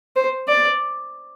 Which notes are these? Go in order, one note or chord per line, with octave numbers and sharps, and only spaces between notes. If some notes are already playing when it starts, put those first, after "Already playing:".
C5
D5